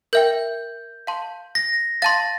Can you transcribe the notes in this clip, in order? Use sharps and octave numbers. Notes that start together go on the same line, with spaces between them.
A#4 E5 G5 G6
F5 A5 C6
A#6
F5 A5 C6 A6